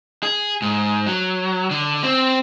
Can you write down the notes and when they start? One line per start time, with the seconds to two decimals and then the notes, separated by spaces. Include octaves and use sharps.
0.23 G#4
0.62 G#2
1.07 F#3
1.71 D3
2.03 C4